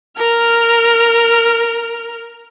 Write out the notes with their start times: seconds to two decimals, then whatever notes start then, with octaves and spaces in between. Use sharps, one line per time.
0.17 A#4 F6